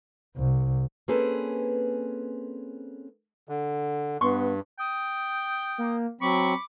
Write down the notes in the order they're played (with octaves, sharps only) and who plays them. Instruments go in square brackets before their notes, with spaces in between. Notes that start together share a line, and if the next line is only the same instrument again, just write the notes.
[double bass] C2
[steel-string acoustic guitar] A#3 C4 C#4 G#4 A4 B4
[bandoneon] D3
[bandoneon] G2 [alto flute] B3 [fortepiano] C6 C#6
[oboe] G5 [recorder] D#6
[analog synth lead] A#3
[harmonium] F#3 C4 [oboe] B5 [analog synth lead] C#6 [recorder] D6